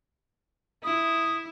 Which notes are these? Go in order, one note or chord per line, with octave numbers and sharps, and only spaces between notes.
E4 D#6